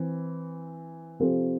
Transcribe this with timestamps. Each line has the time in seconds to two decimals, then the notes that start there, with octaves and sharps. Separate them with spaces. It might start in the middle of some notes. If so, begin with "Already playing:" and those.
Already playing: E3 C4
1.20 C3 F3 C4 F4 A4